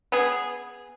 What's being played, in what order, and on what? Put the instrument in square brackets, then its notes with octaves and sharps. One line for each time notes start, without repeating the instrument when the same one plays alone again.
[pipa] B3 G#4